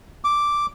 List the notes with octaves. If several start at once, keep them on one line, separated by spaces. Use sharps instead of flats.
D6